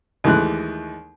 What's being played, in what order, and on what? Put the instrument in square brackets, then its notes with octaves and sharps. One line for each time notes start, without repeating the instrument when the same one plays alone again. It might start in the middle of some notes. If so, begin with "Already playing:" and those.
[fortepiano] D#2 E3 G#3 A3 F#6